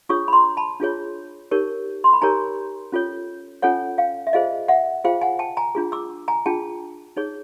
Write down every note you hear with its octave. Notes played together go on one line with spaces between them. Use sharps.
D4 F4 G#4 C#5 C#6 D#6
B5
A#5 C6
A5 B5
D4 F4 G#4 C#5
D#4 G4 A#4 C#5
C6
B5
D#4 G4 A#4 C#5 G#5 A#5
C#4 F4 A4 C#5
C#4 F4 A4 C#5 F#5 G#5
F5 G5
E5
F4 G#4 C5 D#5 F5
E5 F#5
F4 G#4 C5 F5 G5
F#5 G#5
G5 A5
G#5 A#5
D4 F4 G#4
D6 E6
G#5 A#5
D4 F4 G#4 G5 A5
D#4 G#4 C#5